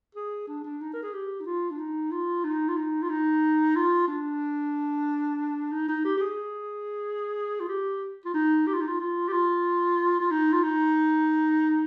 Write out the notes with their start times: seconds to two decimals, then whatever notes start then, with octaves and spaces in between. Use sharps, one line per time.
0.15 G#4
0.48 D4
0.64 D4
0.81 D#4
0.94 A#4
1.03 G#4
1.13 G4
1.40 D#4
1.46 F4
1.71 D4
1.79 D#4
2.11 F4
2.44 D#4
2.68 F4
2.77 D#4
3.02 F4
3.10 D#4
3.76 F4
4.08 D4
5.72 D#4
5.88 D#4
6.05 G4
6.17 G4
6.21 G#4
7.60 F4
7.68 G4
8.25 F4
8.34 D#4
8.67 G4
8.74 F4
8.81 D#4
8.88 F4
9.00 F4
9.28 G4
9.32 F4
10.20 F4
10.31 D#4
10.53 F4
10.63 D#4